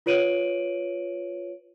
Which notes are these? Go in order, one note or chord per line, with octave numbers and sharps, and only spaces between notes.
F4 B4 C#5 D7 D#7 F#7